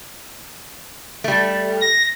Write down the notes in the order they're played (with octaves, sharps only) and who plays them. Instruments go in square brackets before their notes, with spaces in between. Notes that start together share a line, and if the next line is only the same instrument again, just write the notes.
[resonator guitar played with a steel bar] G3 A3
[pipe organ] A#6